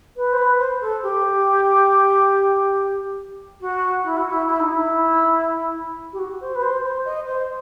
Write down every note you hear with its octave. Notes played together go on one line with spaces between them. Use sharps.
B4
C5
B4
C5
A4
G4
F#4
E4
F#4
E4
E4
D#4
E4
G4
F#4
C5
B4
C5
C5
D#5
C5